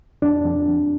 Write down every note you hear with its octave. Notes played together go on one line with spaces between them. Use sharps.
F2 D4
F2
F2